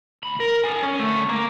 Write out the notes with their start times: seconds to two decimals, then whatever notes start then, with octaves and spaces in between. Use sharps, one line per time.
0.23 D2 B5
0.40 A#4
0.64 A4 G#5
0.83 C#4
0.99 D2 A3
1.29 A#3